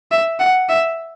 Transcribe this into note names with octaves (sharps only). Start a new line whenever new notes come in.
E5
F#5
E5